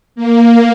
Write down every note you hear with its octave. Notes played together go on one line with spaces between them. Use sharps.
A#3